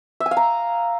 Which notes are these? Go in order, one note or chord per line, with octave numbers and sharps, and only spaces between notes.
E5
G#5
F5
A#5